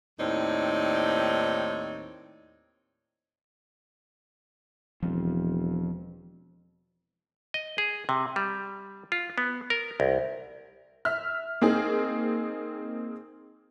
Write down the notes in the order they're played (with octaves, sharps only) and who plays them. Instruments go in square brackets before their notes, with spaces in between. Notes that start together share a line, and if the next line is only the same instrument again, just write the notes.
[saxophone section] D#2 A2 C4 D#4 C#5 D5
[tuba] E1 [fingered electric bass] F3 C4
[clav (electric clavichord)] D#5
G#4
C3
G3
F4
B3
A#4
C2
[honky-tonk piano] E5 F6
A#3 C4 D#4 G#4